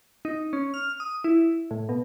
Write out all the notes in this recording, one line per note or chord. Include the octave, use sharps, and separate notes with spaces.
D#4
C#4
F6
D#6
E4
A2
B2